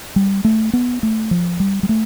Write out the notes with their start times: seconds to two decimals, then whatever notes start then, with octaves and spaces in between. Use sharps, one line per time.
0.16 G3
0.44 A3
0.73 B3
1.03 A3
1.31 F3
1.60 G3
1.83 G3
1.89 A3